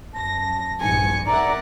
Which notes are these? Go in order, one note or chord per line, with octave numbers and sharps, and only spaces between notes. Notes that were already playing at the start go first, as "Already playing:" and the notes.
F#2 A5 A#6
A#1 G2 G#5 C#7
A#4 D5 E5 F#5 A#5